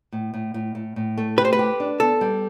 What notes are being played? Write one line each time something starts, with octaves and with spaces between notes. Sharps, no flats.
A2
A2
A2
A2
A2
A3
G4 B4
C5
B4
G4
D4
B3 A4
G3